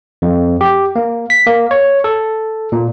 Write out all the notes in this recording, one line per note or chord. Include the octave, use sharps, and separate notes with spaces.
F2
G4
A#3
B6
A#3
C#5
A4
A#2